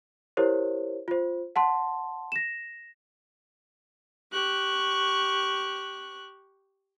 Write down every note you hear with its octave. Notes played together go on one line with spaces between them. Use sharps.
E4 G4 A#4 C5 C#5
F4 C5
F#5 A5 C6
A#6 E7
G4 C#6 F#6